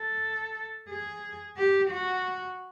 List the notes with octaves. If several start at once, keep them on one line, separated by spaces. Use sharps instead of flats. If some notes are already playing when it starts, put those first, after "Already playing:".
Already playing: A4
G#4
G4
F#4